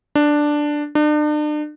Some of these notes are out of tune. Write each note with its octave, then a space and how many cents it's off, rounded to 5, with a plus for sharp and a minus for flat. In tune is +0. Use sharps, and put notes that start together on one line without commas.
D4 +5
D4 +40